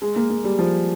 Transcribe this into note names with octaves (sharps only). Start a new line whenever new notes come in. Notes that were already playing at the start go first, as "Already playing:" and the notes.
G#3
A#3
A#3
G3
F3